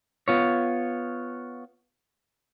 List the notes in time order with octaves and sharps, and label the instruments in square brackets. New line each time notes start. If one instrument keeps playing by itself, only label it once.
[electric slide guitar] B3 F4 C#5